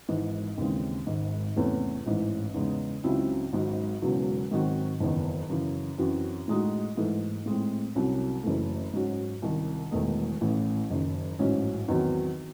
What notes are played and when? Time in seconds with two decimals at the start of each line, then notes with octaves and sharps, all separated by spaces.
0.08 G#1 G#2 E3
0.58 D#2 C#3 E3 G#3 C4
1.07 G#1 G#2 D#3
1.56 E2 C3 E3 A3 C#4
2.06 A1 G#2 E3
2.54 E2 C#3 G#3 D#4
3.04 C#2 C#3 F#3 C4 E4
3.53 G#1 G#2 F#3
4.02 E1 E2 C#3 F#3
4.51 G#2 D#3 F#3 C4 F#4
5.00 F#1 E2 D#3
5.50 F#2 C#3 E3
5.98 F#2 E3 C4 F#4
6.48 A2 G#3 D#4 F#4
6.97 G#2 E3 A3
7.46 A2 G#3 C4
7.95 C2 C3 F#3 C#4
8.44 F#1 F#2 E3 A3
8.94 G#2 F#3 C#4 F#4
9.42 C2 C3 D#3
9.91 E1 E2 D#3 A3 D#4
10.41 A1 A2 E3
10.91 F#1 F#2 D#3
11.39 A1 G#2 F#3 C#4
11.88 E2 D#3 F#3 C4